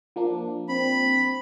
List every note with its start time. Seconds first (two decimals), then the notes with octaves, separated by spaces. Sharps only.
0.16 F3 A#3 D4
0.69 C4 B5